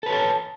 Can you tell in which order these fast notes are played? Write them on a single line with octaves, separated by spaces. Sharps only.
A4 B4 C#5 A5